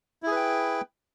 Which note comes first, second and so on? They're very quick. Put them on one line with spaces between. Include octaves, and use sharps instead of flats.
E4 G#4 B4 G5